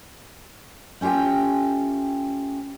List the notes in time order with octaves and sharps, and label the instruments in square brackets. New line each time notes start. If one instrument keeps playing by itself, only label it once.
[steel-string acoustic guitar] A3 C#4 F4 G4 G5